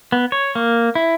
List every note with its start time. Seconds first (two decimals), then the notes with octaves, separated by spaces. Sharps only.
0.12 B3
0.32 C#5
0.55 A#3
0.95 E4